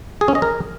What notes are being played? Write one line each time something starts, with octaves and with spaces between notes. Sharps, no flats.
G#4
C#4
D#5
A#4